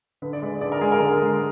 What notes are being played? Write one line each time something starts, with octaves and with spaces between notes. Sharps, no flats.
D3 B4
D5
G#3 B4
D3 D5
A#4
G#3 G#4
A#4
D3
G#3